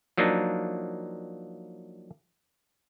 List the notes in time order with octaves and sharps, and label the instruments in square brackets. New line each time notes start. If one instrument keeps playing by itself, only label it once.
[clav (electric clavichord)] F3 F#3 A#3 D4 D#4